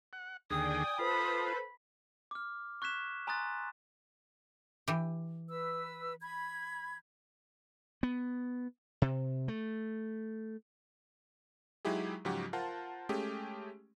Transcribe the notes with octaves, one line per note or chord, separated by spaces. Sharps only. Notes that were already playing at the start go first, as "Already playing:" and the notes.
F#5
D#2 D3 G#4 D5 G5 G#5 D#6
F4 A4 B4 C5 B5
D6 F6
C#6 F#6 G#6 B6 E7
G#5 A#5 C6 D#6 F#6 A6
E3 G4
B4 E6
B5 G#6
B3
C3
A3
F#3 G#3 D#4 E4 G4 G#4
G#2 C#3 F3 F#3 F#4 G4
F4 A#4 C5 F#5 A5
G#3 A3 C#4 G4 G#4